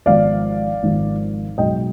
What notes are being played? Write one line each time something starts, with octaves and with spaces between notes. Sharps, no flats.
G#1 G#2 F3 D5 F5
G#1 G#2 F3
B1 B2 G#3 D#5 G5